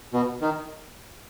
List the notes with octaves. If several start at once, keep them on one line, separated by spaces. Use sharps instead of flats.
B2
D#3